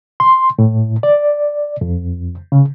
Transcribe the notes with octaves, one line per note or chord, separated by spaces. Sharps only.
C6
A2
D5
F2
C#3